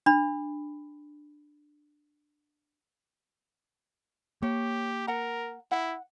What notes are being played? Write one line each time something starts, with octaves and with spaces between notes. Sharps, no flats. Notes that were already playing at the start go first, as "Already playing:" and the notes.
D4 B5
A#3 G4 C#5
A#4 F#5 A#5
E4 F#5